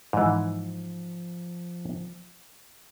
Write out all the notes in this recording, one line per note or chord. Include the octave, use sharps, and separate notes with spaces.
G#2 E3 F3